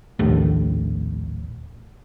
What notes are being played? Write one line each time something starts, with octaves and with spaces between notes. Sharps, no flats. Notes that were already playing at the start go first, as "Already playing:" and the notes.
A#1 D#2 A2